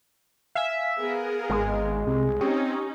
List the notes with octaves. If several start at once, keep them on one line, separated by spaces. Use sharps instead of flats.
E5 F5 G#5
B3 G#4 A#4
G#1 G#3
C2 C3
C4 C#4 D#4 G4 C#6 D#6